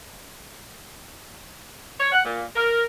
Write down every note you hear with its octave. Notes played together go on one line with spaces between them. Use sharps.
C#5
F#5
A#2
A#4